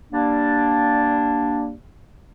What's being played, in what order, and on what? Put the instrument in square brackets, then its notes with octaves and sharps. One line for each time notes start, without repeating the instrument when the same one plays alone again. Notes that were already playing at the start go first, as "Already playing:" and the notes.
[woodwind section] G3 A#3 D4